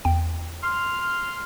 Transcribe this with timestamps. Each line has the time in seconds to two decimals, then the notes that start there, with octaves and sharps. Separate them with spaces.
0.05 E2 G5
0.62 C6 F6